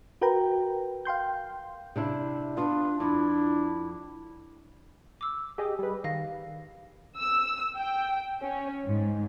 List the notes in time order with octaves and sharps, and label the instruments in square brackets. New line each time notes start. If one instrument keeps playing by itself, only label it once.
[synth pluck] F#4 A#4 B4 G5 A#5
F5 G5 C6 G6
[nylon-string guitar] C3 D4 E4
[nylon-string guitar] B3 [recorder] D4 [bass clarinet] F4
[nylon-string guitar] F2 [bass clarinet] D4 [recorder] E4
[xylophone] D6 E6
[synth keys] G4 G#4 D#5
G3 B4
[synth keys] D#3 [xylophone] F5 A#6
[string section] E6
G5
C#4
G#2